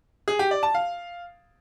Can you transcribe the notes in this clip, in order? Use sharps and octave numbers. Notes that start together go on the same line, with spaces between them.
G#4
G4
D5
A5
F5